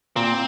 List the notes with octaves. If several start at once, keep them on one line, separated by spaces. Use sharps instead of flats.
A#2 C4